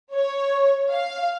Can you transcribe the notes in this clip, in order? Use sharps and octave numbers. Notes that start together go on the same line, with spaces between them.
C#5
F5